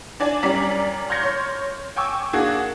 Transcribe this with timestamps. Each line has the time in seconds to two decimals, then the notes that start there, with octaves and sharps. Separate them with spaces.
0.20 D4 D5 G#5
0.43 F#2 G3 C#4 D5 A#5 B6
1.10 C6 F6 G6 G#6 A#6 C#7
1.22 C#5 C6
1.96 G5 G#5 C#6 D6 E6
2.33 A#3 D4 F#4 G#4